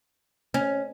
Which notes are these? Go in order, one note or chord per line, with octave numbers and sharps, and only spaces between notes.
C#4